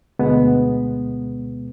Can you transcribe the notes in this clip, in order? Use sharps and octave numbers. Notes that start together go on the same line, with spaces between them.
D2 B2 G#3 B3